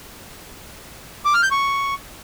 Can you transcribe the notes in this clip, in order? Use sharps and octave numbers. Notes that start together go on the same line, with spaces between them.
D6
F6
G6
C#6